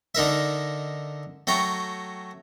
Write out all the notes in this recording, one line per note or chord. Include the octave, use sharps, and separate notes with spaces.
D3 D#4 A#4 E5
F#3 A3 G5 A#5 C#6